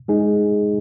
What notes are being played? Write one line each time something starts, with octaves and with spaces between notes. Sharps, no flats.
G#3 D#4 G#4